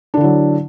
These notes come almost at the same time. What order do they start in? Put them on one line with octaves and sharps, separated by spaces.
D4 D3 E4 F#3